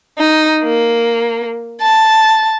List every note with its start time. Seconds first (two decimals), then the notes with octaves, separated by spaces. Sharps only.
0.19 D#4
0.64 A#3
1.82 A5